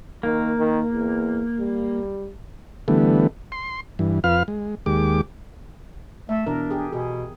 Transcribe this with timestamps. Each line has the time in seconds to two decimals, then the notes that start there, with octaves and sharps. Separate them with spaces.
0.23 D#3 A#3
0.58 D#3
0.92 E2
1.59 G3
2.88 D3 E3 G3 A3 B3
3.52 C6
3.99 G2 E3
4.24 F2 F4 B4 F5 F6
4.48 G#3
4.86 D#2 G#3 G4 D6
6.29 A3 E5
6.46 B2 E3 D4 A#4
6.71 G4 G#4
6.93 B2 G#4